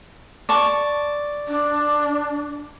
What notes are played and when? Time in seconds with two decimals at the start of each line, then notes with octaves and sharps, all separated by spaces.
0.49 D5 A5 C#6
1.48 D4